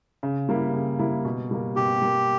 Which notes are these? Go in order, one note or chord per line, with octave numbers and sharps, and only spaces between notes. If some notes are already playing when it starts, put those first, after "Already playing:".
C#3
G3 A#3 E4
C#3
G3 A#3 E4
B2
G3 A#3
B2 G4
G3 A#3